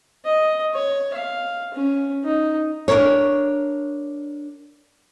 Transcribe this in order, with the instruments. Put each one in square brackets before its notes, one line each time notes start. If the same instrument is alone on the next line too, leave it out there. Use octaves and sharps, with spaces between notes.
[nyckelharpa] D#5
C#5
F5
C#4
D#4
[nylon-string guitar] D4 A#4 C#5